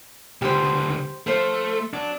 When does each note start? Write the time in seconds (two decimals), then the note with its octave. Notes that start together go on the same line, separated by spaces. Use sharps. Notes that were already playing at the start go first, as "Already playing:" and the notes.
0.42 C#2 D3 G4 C5
1.27 F3 A3 C5
1.93 F#3 D4